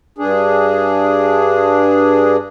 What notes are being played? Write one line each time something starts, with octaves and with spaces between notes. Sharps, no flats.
G2 D4 G#4